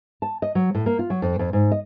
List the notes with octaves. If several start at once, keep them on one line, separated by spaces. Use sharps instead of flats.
A5
D#5
F#3
A2
A#3
F4
F#3
F2
F2
G#2
D#5